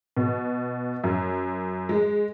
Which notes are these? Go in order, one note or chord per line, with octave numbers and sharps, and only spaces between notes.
B2
F#2
G#3